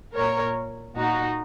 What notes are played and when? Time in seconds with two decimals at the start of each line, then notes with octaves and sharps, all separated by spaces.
0.16 A#2 A#4 C#5
0.98 A#2 D#4 F#4